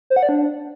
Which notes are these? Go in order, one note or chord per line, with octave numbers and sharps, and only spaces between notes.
C5
F#5
D5
D4